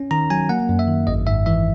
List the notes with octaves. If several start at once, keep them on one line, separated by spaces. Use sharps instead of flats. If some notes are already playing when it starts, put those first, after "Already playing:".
Already playing: C#4
D#3 A#5
F#3 G#5
A#3 F#5
F#2
E5
D#3
G#1 D#5
G#2 E5
E3 E5